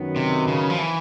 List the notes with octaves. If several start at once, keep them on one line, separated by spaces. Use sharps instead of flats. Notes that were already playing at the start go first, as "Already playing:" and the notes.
Already playing: F#2 D#3 F#3 B3
C3
C#3
F3
E3